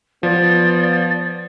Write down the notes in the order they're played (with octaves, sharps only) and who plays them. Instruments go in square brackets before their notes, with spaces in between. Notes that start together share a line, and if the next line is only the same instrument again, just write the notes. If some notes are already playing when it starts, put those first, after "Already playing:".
[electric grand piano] F3 [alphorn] B3 [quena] D5